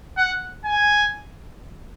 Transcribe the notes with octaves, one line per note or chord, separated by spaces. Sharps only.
F#5
G#5